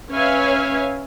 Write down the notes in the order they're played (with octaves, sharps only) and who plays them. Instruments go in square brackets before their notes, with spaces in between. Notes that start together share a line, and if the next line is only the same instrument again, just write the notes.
[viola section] C#4 B4 C#5 E5 F5 G#5